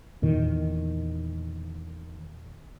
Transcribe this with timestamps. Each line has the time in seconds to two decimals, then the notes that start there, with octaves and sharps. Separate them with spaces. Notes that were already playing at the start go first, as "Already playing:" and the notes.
0.22 E2 A#2 D#3